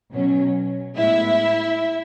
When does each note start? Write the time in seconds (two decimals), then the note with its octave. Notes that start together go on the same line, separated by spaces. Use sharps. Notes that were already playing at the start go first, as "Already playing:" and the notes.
0.11 B2 F#3 C#4
0.97 A2 G#3 B3 E4 E5